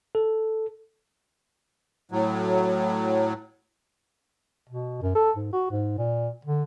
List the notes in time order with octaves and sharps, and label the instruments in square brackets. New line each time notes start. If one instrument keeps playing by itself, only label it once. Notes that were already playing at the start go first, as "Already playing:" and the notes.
[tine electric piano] A4
[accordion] A2 F#3
[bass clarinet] B2
F#2
A4
G#2
F#4
G#2
A#2
D3